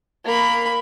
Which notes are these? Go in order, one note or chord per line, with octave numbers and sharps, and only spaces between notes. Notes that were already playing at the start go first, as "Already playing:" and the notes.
A#3 B5